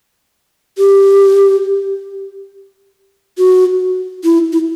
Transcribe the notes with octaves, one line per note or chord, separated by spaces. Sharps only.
G4
F#4
E4
E4